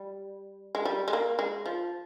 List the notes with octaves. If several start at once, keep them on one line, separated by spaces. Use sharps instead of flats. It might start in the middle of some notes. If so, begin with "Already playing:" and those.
Already playing: G3
G#3
G3
G#3
A#3
G#3
F3